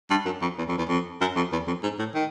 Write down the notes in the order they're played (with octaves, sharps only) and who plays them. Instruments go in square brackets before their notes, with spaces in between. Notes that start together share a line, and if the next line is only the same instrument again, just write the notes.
[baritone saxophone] G2
F#2
F2
E2
F2
E2
F2
F#2
F2
E2
F2
G#2
A2
D#3